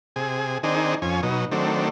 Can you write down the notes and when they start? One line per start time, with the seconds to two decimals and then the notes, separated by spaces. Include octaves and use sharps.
0.16 C3 G#4
0.63 D#3 C4 D4 D#4 G#4
1.02 F2 C#4 G#5
1.23 B2 F#3 D#4
1.52 D#3 F#3 A3 C4 D4